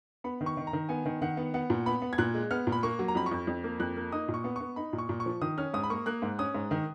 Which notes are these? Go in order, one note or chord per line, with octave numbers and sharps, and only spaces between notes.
B3 B5
D#3
C#6
D#3
A#5
D#3
B3 G#5
D#3
D#3 F#5
B3
B3 F#5
A#2
B3 B5
B3
G#6
A#2 F#6
G#3
B3 F6
A#2
B5
A#3 C#6
F#3
A#5
F2 B5
C#6
F2
F2
A#3
F2 F#6
A#3
D#4 D#6
A#2
C#6
B3
B3 C#6
D#4 B5
A#2
C#6
A#2
C#6
F3
D#3 D#6
C#4 F6
G#2 D#6
B5
A#3 C#6
A#3 F#6
G#2
C#4 D#6
G#2
D#3